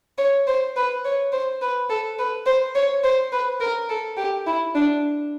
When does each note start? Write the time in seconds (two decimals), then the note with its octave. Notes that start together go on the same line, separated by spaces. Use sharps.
0.18 C#5
0.47 C5
0.76 B4
1.05 C#5
1.32 C5
1.62 B4
1.89 A4
2.18 B4
2.46 C5
2.75 C#5
3.04 C5
3.32 B4
3.61 A#4
3.89 A4
4.17 G4
4.46 E4
4.75 D4